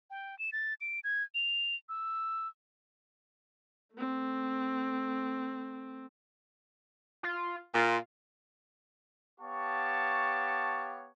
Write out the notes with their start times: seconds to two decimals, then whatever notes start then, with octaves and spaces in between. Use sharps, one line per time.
0.10 G5
0.39 E7
0.52 A6
0.81 D7
1.04 G#6
1.35 F7
1.89 E6
3.95 A3 C4
7.23 F4
7.74 A#2 F4
9.40 B3 G4 C#5 F5 A5 C#6